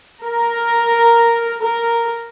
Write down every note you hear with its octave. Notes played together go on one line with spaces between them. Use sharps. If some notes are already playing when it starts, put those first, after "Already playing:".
A#4
A#4